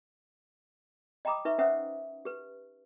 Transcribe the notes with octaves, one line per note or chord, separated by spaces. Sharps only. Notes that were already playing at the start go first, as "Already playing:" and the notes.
D#5 G5 A#5 B5 D6 D#6
D#4 B4 E5 C#6
C#4 B4 C5 E5 F#5 D#6
G4 B4